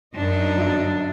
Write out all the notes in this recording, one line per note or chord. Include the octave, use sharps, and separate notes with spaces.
F#2 D4 D#4
G1 F#3 E5